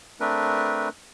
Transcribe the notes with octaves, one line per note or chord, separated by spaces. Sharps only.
A3 C4 D4 A#4 B4